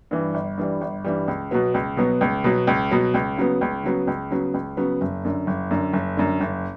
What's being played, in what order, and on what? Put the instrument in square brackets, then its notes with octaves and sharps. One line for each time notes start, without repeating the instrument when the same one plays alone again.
[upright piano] G2 E3 G3
G1
G2 E3 G3
G1
G2 E3 G3
C#2
B2 F#3 B3
C#2
B2 F#3 B3
C#2
B2 F#3 B3
C#2
B2 F#3 B3
C#2
C#3 F#3 B3
C#2
C#3 F#3 B3
C#2
C#3 F#3 B3
C#2
C#3 F#3 B3
F#1
F#2 D3
F#1
F#2 D3
F#1
F#2 D3
F#1